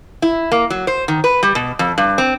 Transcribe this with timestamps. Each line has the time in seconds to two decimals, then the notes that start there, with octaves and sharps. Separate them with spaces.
0.22 E4
0.52 A#3
0.70 F#3
0.87 C5
1.08 D#3
1.24 B4
1.43 G3
1.55 B2
1.79 F2
1.98 G2
2.18 C4